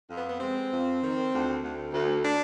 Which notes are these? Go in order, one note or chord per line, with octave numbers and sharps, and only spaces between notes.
F2
B3
B3
G#3 C4
F2
D#3
D2
D2
D2
D4